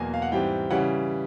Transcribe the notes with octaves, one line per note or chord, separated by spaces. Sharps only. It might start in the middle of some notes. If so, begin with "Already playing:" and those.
Already playing: E2 B2 F#3 A#3 G#5
F5
F#5
G#2 E3 G3 C4 G5
C#3 E3 G3 F#5